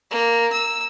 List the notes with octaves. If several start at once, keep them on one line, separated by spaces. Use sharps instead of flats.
A#3
E6